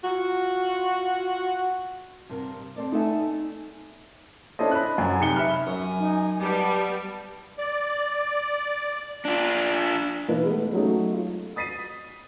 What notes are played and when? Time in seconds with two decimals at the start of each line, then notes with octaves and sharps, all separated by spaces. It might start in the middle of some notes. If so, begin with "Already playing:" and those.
0.05 F4 F#4
2.29 G2 C3 A#4
2.76 C4 A4 D5
2.92 A3 B3 D#4 A4 E5 G#5
4.59 C#4 D4 E4 A4 C5 D#5
4.71 B5 F#6
4.98 F#2 G#5
5.20 C3 D#4 C#7 G7
5.35 E5 B5 F6 F#6
5.67 F#2 G#5
5.98 D#4
6.41 G3 B3 A5
7.58 D5
9.25 D4 F4
10.28 B2 E3 A#3 D#4 A#4 B4
10.44 G#3 A3 B3
10.73 F#3 G#3 A3 C#4 D#4 F#4
11.13 F4
11.56 D#6 A6 B6 C7 D#7